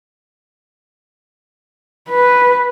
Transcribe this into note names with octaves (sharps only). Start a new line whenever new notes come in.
B4